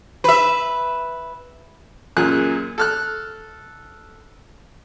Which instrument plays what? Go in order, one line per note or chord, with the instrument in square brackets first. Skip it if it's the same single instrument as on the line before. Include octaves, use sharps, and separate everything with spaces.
[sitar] B4 E5
[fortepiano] F#2 A#2 G#4 F#6
A4 F6 F#6